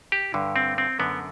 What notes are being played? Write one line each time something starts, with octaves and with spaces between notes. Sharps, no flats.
G4
G2 D3
C4
C4
F#2 D3 B3